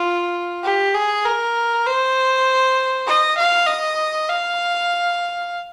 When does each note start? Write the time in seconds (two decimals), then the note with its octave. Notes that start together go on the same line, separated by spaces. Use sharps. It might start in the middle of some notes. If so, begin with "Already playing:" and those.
Already playing: F4
0.64 G4
0.94 G#4
1.25 A#4
1.86 C5
3.07 D#5
3.38 F5
3.67 D#5
4.29 F5